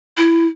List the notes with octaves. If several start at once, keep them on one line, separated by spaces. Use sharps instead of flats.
E4